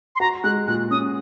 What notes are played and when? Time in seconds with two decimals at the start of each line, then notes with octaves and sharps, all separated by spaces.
0.15 C6
0.20 F#4 A#5
0.44 G#3 F#6
0.67 A#2 F#6
0.91 C#4 D#6